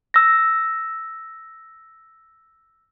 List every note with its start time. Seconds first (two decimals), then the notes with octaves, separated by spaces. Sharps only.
0.14 E6 A#6